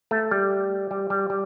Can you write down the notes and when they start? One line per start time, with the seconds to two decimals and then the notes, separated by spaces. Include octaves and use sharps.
0.11 A3
0.31 G3
0.91 G3
1.10 G3
1.30 G3